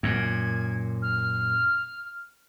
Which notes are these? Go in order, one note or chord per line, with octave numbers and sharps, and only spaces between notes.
F#2 A#2 G#6
F6